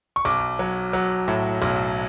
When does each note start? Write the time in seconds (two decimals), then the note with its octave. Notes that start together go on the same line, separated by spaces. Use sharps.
0.16 C#6
0.25 B1 D6
0.59 F#3
0.93 F#3
1.28 A2
1.62 B1